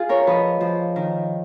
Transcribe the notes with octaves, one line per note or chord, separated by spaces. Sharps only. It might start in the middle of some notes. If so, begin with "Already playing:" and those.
Already playing: F4 G#4 F5
A#4 C#5
F3 B4 D#5
F3
D#3